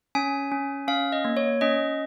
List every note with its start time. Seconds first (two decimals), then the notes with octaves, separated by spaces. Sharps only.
0.15 C#4 G#5
0.52 C#4
0.88 C#4 F5
1.12 D#5
1.25 A#3
1.37 C#5
1.61 C#4 D#5